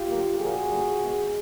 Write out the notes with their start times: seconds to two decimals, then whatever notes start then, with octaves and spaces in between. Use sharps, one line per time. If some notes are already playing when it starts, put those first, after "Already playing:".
Already playing: F4 G4
0.09 D3 F#3 A#3
0.39 A#2 F3 A#3 F#4 G#4
0.69 D3 G3 A#3
0.99 B2 G#3 B3